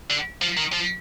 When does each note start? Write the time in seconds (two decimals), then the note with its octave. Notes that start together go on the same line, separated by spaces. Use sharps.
0.10 D3
0.42 F3
0.57 D#3
0.73 F3